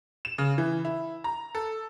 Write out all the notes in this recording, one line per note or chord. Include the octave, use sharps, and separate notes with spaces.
E7
C#3
E3
E4
A#5
A4